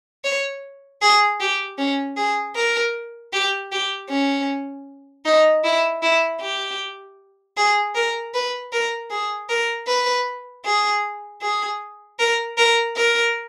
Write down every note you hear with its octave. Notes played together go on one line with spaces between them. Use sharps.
C#5
G#4
G4
C#4
G#4
A#4
G4
G4
C#4
D#4
E4
E4
G4
G#4
A#4
B4
A#4
G#4
A#4
B4
G#4
G#4
A#4
A#4
A#4